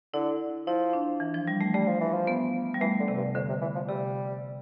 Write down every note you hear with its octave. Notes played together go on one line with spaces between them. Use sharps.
D3 E4
F3 E4
D4
E3
F3
G3
A3
G3 A3
F3
E3
F3
B3
G3
E3 A3
D3
C3
G2
F2 D3
C3
E3
F3
C3 G3